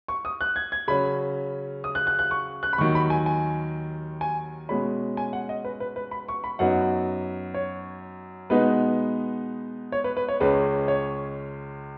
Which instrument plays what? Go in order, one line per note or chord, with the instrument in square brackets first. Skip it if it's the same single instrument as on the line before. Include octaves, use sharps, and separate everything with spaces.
[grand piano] C#6
D#6
F#6
G#6
G#6
C#3 F#3 C#4 B5
D#6
F#6
F#6
F#6
C#6
F#6
B5
D#2 C#6
D#3 F#3
B5
G#5
G#5
G#5
B2 G#3 C#4 B5
G#5
F#5
D#5
B4
B4
B4
B5
C#6
B5
F#2 F#3 B3 D#4 F#5
C#5
B2 G#3 B3 D#4 B4
C#5
B4
B4
C#5
C#2 C#3 G#3 C#4 B4
C#5